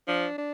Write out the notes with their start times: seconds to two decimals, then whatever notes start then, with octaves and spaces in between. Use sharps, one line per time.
0.08 F3 D4
0.38 D4